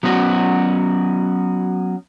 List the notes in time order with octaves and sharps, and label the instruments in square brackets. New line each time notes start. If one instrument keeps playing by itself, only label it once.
[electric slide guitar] F#3 B3 C#4 F#4